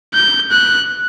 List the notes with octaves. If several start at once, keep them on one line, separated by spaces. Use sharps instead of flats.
G6
F#6